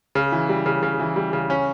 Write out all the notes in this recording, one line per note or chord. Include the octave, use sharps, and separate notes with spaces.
C#3
E3
G3
C#3
C#3
E3
G3
C#3
C#4